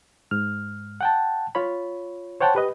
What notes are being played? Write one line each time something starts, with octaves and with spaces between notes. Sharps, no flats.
G#2 F6
F#5 G5 A5
F4 C#5 B5
C5 C#5 F#5 G5 A5
G4 B4 D#5